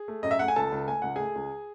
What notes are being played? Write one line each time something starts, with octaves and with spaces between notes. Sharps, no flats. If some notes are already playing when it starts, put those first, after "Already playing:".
Already playing: G#4
A3
F#2 D#5
E5
A3 F#5
G#5
C#2 A4 A5
C#2
A3 G#5
C#2 F#5
A3 G#4 G#5
C#2